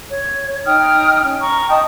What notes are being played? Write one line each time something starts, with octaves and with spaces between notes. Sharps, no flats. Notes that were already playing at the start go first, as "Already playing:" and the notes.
C#5
D#4 G5 D#6 F6
C#4
A#5 C#6
D#5 G5 A5 D#6